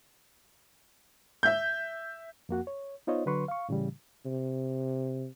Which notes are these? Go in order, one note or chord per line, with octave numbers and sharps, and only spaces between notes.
E5 G6
F2 A#3 F#4 F#5
C#5
B3 D#4 F4 C5 C#5 D#5
D3 F#3 B4 C6 C#6
F5 C#6
A2 C#3 E3 G3
C3